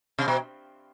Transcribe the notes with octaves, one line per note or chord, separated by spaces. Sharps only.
C3
B2